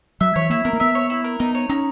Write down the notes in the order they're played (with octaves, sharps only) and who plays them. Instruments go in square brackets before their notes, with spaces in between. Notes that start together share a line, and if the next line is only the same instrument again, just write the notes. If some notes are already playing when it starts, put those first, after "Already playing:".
[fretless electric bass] F#3 [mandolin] E5
[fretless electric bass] E3 [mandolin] C#5
[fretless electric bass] A#3 [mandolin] E4
[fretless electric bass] B3 [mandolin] A#4
[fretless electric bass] A#3
[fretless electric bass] B3 [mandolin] E5
[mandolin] C#5
E4
A#4
[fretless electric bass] B3 [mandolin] D#4
[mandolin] C#5
[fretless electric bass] C#4 [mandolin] D#4